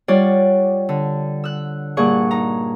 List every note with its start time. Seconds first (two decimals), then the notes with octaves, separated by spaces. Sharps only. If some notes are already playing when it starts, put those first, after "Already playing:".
0.08 G3 F4 C#5 D5 F#5
0.89 D3
1.44 E6 F#6
1.97 G2 A#2 G#4 D5 F#5 C#6
2.31 D#4 A#5